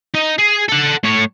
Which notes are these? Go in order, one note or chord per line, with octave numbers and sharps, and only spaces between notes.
D#4
G#4
A4 F#5
A2 C#5